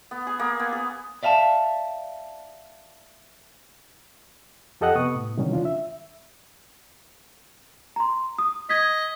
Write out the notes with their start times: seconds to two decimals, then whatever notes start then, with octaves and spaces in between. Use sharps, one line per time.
0.11 B3
0.27 G#4
0.39 A#3
0.59 B3
0.72 G#4
1.23 D5 E5 F5 G#5 A5
4.81 F2 G4 A4 D#5 F#5 F#6
4.95 C3 B3 C#6 D#6
5.15 A2
5.37 C3 D#3 E3 F#3 G3 C#4
5.53 D2 D4 F4
5.65 E5
7.96 A#5 C6
8.38 D#6
8.69 D#5 G#6 B6